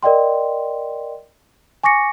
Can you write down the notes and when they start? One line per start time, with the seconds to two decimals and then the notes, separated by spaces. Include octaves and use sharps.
0.03 A#4 D5 D#5 G5 C6
1.83 G#5 C#6 D6 A#6 C#7